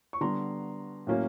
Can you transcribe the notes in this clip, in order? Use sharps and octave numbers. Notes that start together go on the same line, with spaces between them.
C#6
D3 G3 B3 A#5 C6
A2 F#3 A#3 C#4